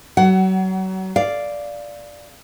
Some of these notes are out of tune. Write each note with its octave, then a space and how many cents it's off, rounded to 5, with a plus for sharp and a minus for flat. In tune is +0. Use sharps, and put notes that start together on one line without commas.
F#3 +35 F#5 +25
D5 +0 F5 -5